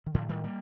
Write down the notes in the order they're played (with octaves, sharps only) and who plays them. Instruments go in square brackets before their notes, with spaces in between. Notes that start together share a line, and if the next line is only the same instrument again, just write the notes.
[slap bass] D#3
A2 D3 F3
D#3 G3
G3 A#3